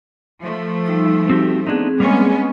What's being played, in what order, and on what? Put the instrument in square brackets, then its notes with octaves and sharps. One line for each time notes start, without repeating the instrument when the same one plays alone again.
[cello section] F3 A3
[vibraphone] G3 D#4 E6
[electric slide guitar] C4 F#4 G4
[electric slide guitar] B3 D4 D#4 [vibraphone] C4 G#4
[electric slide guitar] G3 A#3 [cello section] G#3 B3 C#4